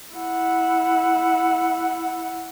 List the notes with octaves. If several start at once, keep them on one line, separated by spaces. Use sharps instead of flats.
E4 F#5